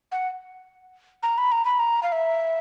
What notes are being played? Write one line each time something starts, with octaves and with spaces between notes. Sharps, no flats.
F#5
A#5
B5
A#5
B5
A#5
F5
E5